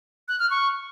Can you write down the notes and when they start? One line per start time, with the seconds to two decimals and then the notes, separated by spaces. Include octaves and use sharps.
0.28 F#6
0.39 F6
0.50 C#6